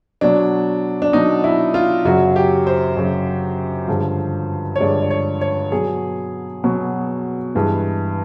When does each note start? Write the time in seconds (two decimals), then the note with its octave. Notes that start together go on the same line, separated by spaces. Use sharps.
0.21 B2 F#3 D4
1.02 D4
1.13 B2 F#3 D#4
1.44 E4
1.74 F4
2.05 F#2 C#3 F#3 F#4
2.36 G4
2.67 C5
2.96 F#2 C#3 F#3
3.88 G2 D3 F3 G#3
4.76 C#5
4.80 G2 D3 F3 G#3 D5
5.02 D5
5.10 C#5
5.41 C#5
5.72 B2 F#3 G#4
6.64 B2 F#3
7.55 G2 E3 G#3